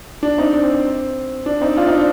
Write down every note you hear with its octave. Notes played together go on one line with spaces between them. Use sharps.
D4
C4 D#4
D4
C4
C4
D4
C4 D#4
D4 F4
C4 D#4
D4